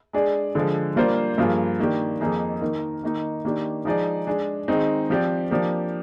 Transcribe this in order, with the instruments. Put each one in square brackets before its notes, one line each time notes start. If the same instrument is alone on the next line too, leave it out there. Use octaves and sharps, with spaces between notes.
[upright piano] G#3 D4 G#4 D5
D3 F3 G#3
G3 A#3 D4 F4 C5
G2 F3 A#3 F4 G#4
D#3 A#3 D4 G4
F2 D#3 A#3 D#4 G#4
D#3 A#3 D#4 A#4
D#3 A#3 D#4
D#3 A#3 D4 G4
F3 G#3 D#4 G#4 D5
G#3 D4 G#4
D#3 G#3 C4 D#4
F3 C4 G4 D5
F3 A#3 D4 G4